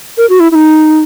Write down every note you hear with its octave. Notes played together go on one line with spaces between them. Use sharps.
A#4
F#4
E4
E4
D#4